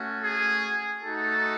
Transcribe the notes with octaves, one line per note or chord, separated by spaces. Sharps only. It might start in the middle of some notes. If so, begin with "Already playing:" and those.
Already playing: A3 C#4 F#4
G#4 G#5
A3 D#4 F#4 A4 A5